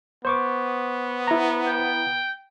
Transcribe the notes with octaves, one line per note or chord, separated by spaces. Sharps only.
B3 C5 C#6 D6
E4 A#5
G5